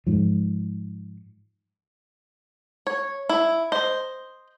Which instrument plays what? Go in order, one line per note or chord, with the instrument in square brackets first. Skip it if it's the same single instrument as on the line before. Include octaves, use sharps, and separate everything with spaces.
[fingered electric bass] G#2 F3
[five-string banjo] C#5
E4
C5 D#5